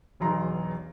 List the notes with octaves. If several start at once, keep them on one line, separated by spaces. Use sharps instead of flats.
E1 B1 E2 A#5 C6